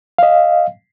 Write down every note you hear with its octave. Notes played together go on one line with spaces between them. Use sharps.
D#5 F5